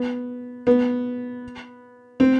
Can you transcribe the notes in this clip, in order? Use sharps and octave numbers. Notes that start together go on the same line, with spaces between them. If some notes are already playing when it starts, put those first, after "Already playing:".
Already playing: B3
B3
C4